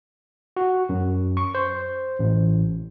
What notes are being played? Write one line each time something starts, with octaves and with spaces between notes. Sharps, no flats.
F#4
F#2
C#6
C5
A1